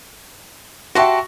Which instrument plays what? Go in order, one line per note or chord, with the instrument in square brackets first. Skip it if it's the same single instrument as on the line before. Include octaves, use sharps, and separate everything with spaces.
[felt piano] F#4 E5 C#6 [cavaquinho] G4 A5 C6